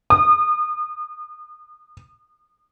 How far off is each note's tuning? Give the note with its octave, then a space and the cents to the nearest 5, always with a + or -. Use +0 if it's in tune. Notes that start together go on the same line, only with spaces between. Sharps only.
D#6 -35